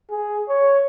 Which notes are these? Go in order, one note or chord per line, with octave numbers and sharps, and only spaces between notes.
G#4
C#5